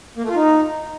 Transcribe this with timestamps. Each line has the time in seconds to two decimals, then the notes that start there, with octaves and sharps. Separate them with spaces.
0.17 A#3
0.23 A3
0.29 F4
0.36 D#4